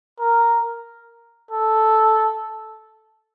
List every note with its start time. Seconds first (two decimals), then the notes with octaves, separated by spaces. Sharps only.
0.20 A#4
1.51 A4